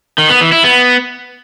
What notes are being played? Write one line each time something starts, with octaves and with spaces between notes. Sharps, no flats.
D#3
B3
E3
E4
B3